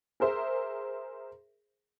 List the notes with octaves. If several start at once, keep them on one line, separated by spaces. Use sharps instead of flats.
G#4 A#4 C5 E5